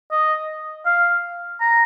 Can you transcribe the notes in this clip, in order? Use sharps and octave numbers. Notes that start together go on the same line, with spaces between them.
D#5
F5
A#5